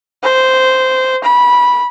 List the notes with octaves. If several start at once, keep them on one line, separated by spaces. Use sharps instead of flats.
C5
B5